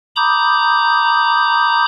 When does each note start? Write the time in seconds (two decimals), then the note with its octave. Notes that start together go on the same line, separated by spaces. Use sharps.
0.16 A#5 B5 D6 D#6 G6